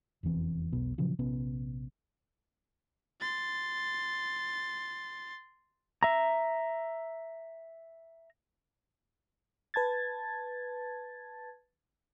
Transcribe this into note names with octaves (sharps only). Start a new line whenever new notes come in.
F1 E2 E3 C4
E1 B1 B2 B3
A#2 C#3 F3 F#3
A#1 C3 B3 C#4
C6 A6
E5 A#5
B4 A5 G#6 A6